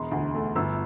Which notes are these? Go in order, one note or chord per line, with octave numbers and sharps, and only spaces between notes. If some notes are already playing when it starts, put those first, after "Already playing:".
Already playing: E1 C6
D2
A3
G1 E6